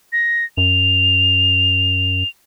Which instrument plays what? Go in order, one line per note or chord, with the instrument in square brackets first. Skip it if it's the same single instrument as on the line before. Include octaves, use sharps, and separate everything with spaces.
[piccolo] A#6
[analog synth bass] F#2 [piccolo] F7